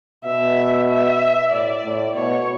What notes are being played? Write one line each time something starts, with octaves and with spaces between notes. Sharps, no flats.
B2 E5
E5
A2 D5
A2
B2 C#5